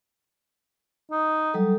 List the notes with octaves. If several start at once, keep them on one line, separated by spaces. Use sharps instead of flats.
D#4
F#3 G3 A4